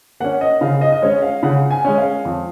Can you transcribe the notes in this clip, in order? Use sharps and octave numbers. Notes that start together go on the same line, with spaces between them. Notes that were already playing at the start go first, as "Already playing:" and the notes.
A#3 C#4 F#5
D#5
C#3 F5
D#5
D#5
G#3 C#4 C#5
F5
C#3 F#5
G#5
G#3 C#4
F5
F2